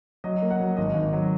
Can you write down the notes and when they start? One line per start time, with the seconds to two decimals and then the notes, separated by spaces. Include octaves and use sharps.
0.24 F#3 D#5
0.42 A#3
0.51 F#5
0.60 F#3
0.77 G#1 D#5
0.94 G#1
1.13 F#3